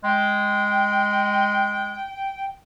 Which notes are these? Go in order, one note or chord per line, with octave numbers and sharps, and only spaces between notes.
G#3 G5